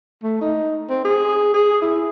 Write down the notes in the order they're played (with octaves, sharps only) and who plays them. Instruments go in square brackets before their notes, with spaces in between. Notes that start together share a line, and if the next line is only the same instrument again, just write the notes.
[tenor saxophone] A3
D#4
C4
G#4
G#4
E4